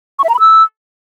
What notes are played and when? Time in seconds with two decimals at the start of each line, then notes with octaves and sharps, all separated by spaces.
0.19 C#6
0.24 E5
0.29 A#5
0.34 B5
0.40 E6